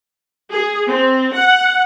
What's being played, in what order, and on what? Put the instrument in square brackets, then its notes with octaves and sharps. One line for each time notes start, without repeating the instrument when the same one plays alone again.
[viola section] G#4
C4
F#5